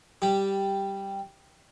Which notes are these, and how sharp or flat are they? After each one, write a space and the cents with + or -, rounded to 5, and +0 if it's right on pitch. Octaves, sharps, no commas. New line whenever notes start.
G3 +0 G4 +0